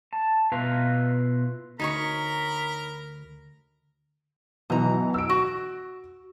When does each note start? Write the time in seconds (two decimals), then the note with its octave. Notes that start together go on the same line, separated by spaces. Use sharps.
0.13 A5
0.52 B2 E4 F4 B4 F5 A#5
1.80 D2 D#4 A#4 C#5 A#5 B5 C#6
4.70 G#2 B2 E3 F#3 A#5
5.14 E6 D7
5.30 F#4